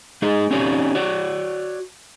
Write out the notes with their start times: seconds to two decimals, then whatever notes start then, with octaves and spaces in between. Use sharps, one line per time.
0.22 G#3 D#4 G#4 D#5
0.51 C4 C#4 D#4 G4 C#5 D5
0.95 F#4 C#5 D5